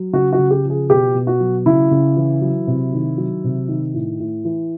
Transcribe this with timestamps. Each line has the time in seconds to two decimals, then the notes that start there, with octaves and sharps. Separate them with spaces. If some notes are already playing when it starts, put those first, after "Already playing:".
Already playing: F#3
0.13 C#3 F#4
0.33 F#4
0.38 C#3
0.50 G4
0.64 F3
0.70 G#4
0.90 B2 G4
1.15 B2
1.27 F#4
1.40 F#3
1.66 C#3 E4
1.91 C#3
2.17 E3
2.41 F#3
2.67 C3
2.93 D#3
3.18 F#3
3.44 C3
3.68 D#3
3.94 A2
4.20 A2
4.45 E3